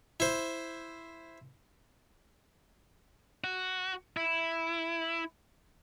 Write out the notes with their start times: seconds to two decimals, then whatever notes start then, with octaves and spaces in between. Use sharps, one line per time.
0.20 E4 C5
3.44 F#4
4.17 E4